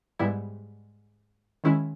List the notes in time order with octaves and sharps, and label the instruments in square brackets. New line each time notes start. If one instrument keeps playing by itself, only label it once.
[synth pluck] G#2 G3 B3 E4
D#3 G#3 C#4 E4